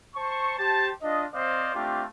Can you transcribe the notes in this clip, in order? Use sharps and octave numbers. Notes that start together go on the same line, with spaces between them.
C5 A5 C#6
G4 C5 A5
D4 F4 D#5
C4 C5 D5 D#5 F5
A3 C4 D4 F4 G4